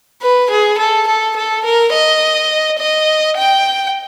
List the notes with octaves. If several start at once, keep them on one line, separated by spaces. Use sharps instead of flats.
B4
G#4
A4
A4
A4
A#4
D#5
D#5
G5